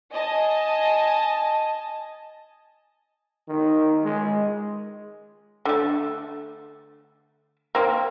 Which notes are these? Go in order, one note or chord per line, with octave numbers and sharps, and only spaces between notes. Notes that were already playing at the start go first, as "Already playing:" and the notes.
D#5 G#5 A5
D#3
G#3
D3 A3
A#3 C4